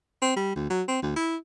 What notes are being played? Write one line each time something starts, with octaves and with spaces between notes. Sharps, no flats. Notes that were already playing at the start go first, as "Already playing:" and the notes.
C4
G3
D2
F#3
C4
D2
E4